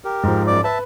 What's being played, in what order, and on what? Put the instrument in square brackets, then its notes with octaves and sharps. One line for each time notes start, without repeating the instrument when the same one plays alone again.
[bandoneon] G4 A#4
[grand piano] G#2 F3
[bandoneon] F#2 D5 D6
[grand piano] B4 [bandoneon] E5 A5